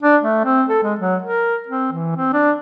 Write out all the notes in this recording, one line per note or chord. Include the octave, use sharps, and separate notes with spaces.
D4
A3
C4
A4
G#3
F#3
A#4
C4
E3
C4
D4